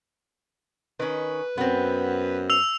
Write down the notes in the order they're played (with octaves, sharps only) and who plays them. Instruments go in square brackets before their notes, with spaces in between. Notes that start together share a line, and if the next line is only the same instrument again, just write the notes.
[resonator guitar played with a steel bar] D#3 C#4 [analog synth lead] B4
[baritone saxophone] F#2 [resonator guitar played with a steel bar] B3 C4
[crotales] E6 F7